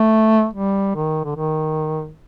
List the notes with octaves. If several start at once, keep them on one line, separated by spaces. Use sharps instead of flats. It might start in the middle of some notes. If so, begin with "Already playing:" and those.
Already playing: A3
G3
D#3
D3
D#3